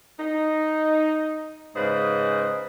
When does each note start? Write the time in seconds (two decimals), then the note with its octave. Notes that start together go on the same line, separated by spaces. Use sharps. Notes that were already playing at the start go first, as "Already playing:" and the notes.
0.19 D#4
1.74 G#2 C#3 B4 C5 D#5